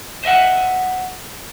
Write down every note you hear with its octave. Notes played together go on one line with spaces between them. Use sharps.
C5 D#5 E5 F#5